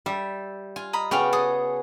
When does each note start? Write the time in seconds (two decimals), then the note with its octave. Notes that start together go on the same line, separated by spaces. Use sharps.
0.06 G3 E5
0.76 F4 G#5
0.93 D#5 A#5 B5
1.11 C#3 B3 F#4 D5 F5 G5
1.33 G#4 A4 D#6